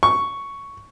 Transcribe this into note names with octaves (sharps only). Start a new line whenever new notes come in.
C#6